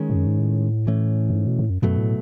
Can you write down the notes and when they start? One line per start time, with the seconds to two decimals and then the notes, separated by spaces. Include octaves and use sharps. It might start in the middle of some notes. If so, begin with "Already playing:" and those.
Already playing: D#3 G#3 C#4
0.10 G#2
0.15 F#2
0.27 G#2
0.38 A2
0.87 E3 A3 C#4
1.30 F#2
1.35 G#2
1.47 B2
1.59 A2
1.70 F#2
1.82 F#2 B2 F#3 A3
1.98 A2